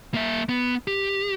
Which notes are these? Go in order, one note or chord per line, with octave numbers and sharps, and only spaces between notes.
A#3 E5
B3
G4